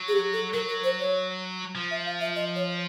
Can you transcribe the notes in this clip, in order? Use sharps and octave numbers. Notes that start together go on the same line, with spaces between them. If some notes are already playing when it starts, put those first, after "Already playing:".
Already playing: F#3
G#4
G4
A4
F#3 A#4
A#4
C5
C#5
F3
E5
F5
E5
D#5
C#5